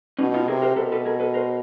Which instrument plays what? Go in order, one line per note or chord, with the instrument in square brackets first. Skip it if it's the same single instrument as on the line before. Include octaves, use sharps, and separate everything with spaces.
[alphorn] B2 [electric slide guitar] C#4 D#4
[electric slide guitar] D#4 F4
[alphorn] C3 [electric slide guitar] G#4 A#4
[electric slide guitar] A#4 C5
[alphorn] B2 [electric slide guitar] A4 B4
[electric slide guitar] A4 B4
G#4 A#4
A4 B4
A#4 C5